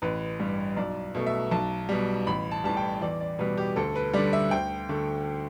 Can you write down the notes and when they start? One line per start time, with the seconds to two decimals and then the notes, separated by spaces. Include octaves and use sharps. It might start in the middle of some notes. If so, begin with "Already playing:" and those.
0.02 A1 B4
0.39 G2 G3
0.77 B1 D5
1.15 B2 A3
1.26 E5
1.51 B1 A5
1.89 B2 G3
2.27 A1 B5
2.51 A5
2.64 A2 E3 G3 A5
2.77 G5
3.01 E2 D5
3.20 D5
3.39 B2 G3 B4
3.57 G4
3.76 D2 A4
3.95 B4
4.13 D3 G3 D5
4.33 E5
4.51 D2 G5
4.89 D3 A3